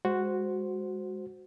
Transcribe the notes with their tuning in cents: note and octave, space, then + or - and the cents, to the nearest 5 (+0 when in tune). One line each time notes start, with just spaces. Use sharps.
G#3 -20 F#4 +0 C5 -5